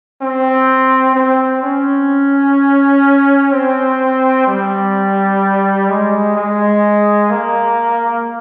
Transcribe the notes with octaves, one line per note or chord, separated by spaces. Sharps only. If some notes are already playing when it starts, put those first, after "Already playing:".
C4
C4
C#4
C4
G3
G#3
G#3
A#3